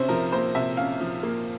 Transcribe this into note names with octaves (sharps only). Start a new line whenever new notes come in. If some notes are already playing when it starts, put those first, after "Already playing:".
Already playing: C3 C#4 C5 E5
F3 A#4
A#3 C5
C3 E5
C#4 F5
F3
A#3